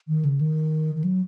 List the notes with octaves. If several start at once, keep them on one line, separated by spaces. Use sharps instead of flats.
D#3
C#3
D#3
D#3
F#3